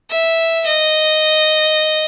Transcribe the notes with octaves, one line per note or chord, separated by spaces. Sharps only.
E5
D#5